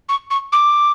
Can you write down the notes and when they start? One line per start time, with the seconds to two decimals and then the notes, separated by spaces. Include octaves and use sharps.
0.09 C#6
0.31 C#6
0.53 D6